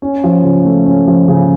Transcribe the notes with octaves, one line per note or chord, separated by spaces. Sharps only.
C#4
F3
C#3
A3
C#4
F3
C#3